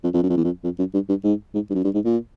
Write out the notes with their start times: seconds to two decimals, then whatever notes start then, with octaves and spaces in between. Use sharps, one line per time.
0.04 F2
0.14 F2
0.23 F#2
0.30 F2
0.37 E2
0.44 F2
0.64 F2
0.79 F#2
0.94 G2
1.09 G2
1.24 G#2
1.54 G#2
1.70 G2
1.75 F#2
1.84 G2
1.94 G#2
2.04 A#2